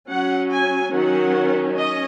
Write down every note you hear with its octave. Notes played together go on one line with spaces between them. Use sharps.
F#3 C#4 F#5
G#5
D#3 F#3 C#4 F#5
C#4 D#5